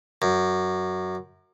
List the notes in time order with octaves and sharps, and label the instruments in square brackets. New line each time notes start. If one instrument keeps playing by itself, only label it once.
[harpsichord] F#2